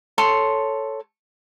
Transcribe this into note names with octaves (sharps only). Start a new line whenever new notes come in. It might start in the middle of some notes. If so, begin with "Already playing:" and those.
A4 C#5 C6